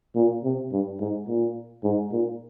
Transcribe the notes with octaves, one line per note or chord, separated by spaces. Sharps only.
A#2
C3
G2
G#2
A#2
G#2
A#2